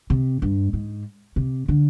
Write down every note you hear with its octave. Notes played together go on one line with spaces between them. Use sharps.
C3
G2
G#2
C3
D3